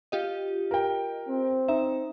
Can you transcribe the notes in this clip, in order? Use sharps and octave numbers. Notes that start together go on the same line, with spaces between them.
F4 G4 D#5
A#4 G5
C4
D#4 E5